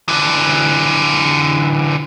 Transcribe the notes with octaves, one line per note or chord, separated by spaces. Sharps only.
D3 E3